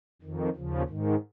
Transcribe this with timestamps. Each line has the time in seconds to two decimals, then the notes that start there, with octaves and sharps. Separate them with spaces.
0.22 F2 D#3
0.56 D#2 C#3 F3
0.89 G#2 D#3